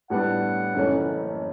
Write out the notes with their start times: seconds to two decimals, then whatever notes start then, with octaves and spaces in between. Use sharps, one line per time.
0.10 A2 G3 B3 D4 F#5
0.74 F#1 F#2 E3 A3 C#4